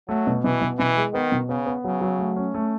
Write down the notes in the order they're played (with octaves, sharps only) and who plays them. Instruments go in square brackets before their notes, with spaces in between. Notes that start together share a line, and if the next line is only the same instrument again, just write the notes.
[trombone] F#3 [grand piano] A3
[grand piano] B2
[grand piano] B2 [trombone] E3
[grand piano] B2
[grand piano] B2 [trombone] E3
[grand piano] G#3
[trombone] D#3 [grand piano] B3
[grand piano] B2
[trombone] C#3 [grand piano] B3
[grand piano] B3
[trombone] C#3 [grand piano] F#3
[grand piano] F#3
A3
C#4
A3